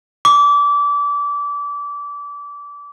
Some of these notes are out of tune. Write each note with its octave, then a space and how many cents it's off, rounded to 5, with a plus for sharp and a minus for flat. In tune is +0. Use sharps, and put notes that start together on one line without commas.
D6 -25